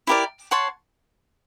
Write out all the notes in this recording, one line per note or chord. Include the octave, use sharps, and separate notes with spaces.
E4 G4 A#4 D5
C#5 F#5 A5 C6